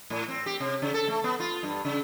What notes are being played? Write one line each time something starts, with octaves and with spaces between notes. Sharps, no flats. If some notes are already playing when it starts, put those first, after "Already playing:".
A2
C4
G4
C3
C#3
A4
A3
B3
F4
G2
C#3